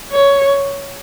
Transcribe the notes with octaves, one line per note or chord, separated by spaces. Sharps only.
C#5